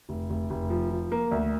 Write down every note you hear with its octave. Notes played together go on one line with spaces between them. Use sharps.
F1
F1
F1
F3
F3
A#3
D2